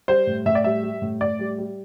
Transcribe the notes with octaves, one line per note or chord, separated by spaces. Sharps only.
G3 C5
A2
A2 E5
D5
G3 E5
G3
A2
A2 D5
G3
G3